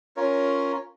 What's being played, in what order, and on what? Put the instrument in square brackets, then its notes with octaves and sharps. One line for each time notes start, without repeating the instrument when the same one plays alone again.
[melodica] C#4 F4 A#4 C#5